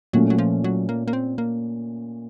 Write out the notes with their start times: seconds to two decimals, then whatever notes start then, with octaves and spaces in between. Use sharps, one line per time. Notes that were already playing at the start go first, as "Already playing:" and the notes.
0.13 A#2 F#3 A3 C#4
0.30 F#3
0.38 F3
0.64 F#3
0.89 A#3
1.08 A#3
1.13 C4
1.38 A#3